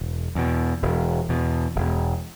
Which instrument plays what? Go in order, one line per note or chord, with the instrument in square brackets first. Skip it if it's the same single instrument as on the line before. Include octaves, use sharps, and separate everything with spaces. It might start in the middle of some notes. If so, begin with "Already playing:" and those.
Already playing: [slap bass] E1
E2 B2
E1
E2 B2
E1